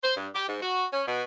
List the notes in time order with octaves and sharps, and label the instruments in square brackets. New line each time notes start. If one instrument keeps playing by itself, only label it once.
[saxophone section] C5
G2
G4
G#2
F#4
C#4
B2